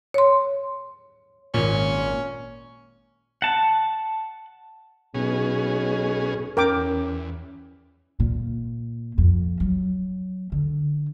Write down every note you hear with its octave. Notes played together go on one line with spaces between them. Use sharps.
C#5 C6
G#1 A#2 C#4
F#5 A5
B1 B2 C#4 G#4
E2 C#4 A#4 G5 D6
A#2
F2
F#3
D3